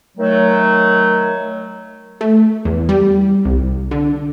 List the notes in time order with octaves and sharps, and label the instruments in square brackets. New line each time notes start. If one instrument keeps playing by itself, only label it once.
[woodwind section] D#3 F#3 A3
[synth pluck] A3
E2
G3
C2
D3